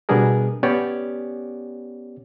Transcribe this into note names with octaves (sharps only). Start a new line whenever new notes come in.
B2 G3 B3 D4 G#4 A#4
B3 C#4 G4 C#5 D5